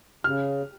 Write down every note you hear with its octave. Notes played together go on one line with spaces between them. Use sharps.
C#3 F6